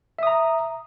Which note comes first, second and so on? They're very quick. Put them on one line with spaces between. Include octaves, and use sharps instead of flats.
E5 D#6 A#5